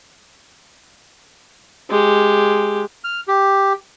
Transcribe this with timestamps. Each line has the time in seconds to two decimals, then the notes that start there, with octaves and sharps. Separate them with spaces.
1.90 G#3 G4
3.04 F6
3.28 G4